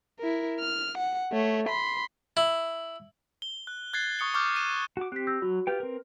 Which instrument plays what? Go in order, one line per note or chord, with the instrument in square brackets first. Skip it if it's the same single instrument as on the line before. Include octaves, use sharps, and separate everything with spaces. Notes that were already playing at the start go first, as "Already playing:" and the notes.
[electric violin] E4 A#4
F6
F#5
A3 C#5
B5 C6
[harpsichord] E4
[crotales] G7
F#6
F#6 G#6 A6 C7
C#6 D#6 C#7 G7
C#6 D6 F6 G6
C7 D#7 E7
[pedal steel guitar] F#4 D6
[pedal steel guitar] C4 G4 [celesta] F#6 B6
[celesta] E6 G6 A#6
[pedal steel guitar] F#3 [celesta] F#4
[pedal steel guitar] F4 G4 G5 [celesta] B4
[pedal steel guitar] C4 A#4